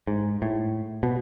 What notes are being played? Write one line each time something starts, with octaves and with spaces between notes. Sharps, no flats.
G#2
A2
B2